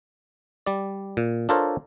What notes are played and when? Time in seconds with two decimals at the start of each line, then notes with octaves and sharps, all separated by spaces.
0.66 G3 D5
1.17 A#2
1.49 D4 F4 A4 A#4 C5 C#5